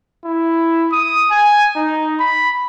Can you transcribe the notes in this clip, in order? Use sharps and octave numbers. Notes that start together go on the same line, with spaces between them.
E4
D#6
G#5
D#4
B5